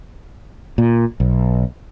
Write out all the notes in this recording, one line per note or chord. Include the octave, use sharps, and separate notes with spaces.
A#2
B1